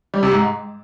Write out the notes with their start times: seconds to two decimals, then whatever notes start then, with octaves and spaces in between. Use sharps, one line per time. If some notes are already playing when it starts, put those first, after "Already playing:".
0.14 G3
0.23 C3
0.32 G#2